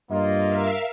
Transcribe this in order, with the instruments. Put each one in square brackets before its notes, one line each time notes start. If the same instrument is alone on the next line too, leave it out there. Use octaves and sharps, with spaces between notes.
[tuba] G2 [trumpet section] A#3 F4 [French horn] D#5
[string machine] A#4 E5 F5